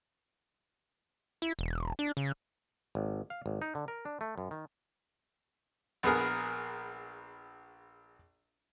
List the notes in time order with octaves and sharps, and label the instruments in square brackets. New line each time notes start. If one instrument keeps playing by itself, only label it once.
[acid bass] E4
E1
D4
C#3
[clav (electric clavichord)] G#1
F5
G#1
D#4
D3
A#4
D4
A3
F#2
D#3
[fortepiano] A#1 B3 G#4 A#4